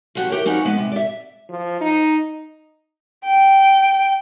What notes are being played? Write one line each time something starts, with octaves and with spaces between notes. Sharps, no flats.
F3 F#4 G4
E4 G4 A#4 C#5
F3 B3 C#4 D#4 F#4
G#3 B3
C3
D5 E5
F3
D#4
G5